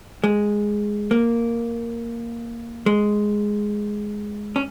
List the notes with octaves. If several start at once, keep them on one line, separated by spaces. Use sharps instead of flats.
G#3
A#3
G#3
C#4